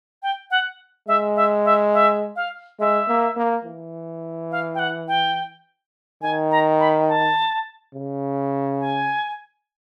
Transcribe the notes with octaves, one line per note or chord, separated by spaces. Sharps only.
G5
F#5
G#3 E5
E5
E5
E5
F5
G#3 E5
A#3
A#3
E3
F5
G5
F#5
G5
D#3 G#5
A#5
B5
A5
C#3
G#5